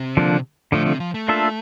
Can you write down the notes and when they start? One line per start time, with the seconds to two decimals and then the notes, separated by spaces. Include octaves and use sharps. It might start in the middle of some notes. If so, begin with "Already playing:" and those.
Already playing: C3
0.17 D3 F3 A#3 D4
0.72 A2 D3 F3 A3
0.86 C3
1.00 F3
1.14 A3
1.28 A#3 D4 F4 A4 E5